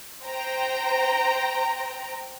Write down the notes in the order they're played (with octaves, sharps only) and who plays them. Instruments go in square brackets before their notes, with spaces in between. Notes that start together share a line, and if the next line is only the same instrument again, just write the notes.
[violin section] C5 G5 A#5